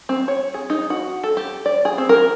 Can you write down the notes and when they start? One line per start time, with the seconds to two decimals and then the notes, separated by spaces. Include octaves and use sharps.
0.09 C4
0.28 C#5
0.54 G#4
0.70 D#4
0.90 F#4
1.24 A4
1.37 G4
1.66 D5
1.85 G#4
1.98 C4
2.09 A#4